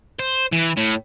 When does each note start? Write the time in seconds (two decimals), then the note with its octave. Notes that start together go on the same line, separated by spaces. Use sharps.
0.19 C5
0.52 E3
0.77 A2